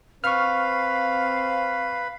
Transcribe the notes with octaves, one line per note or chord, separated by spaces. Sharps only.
C4 B4 F5 C#6 F6